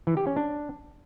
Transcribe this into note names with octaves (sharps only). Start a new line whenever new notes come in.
E3
G4
C#4
D4